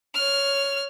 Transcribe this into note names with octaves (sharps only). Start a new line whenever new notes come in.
C#5 F6